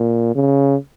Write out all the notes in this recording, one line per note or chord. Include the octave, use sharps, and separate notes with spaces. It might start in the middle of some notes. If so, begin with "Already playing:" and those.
Already playing: A#2
C#3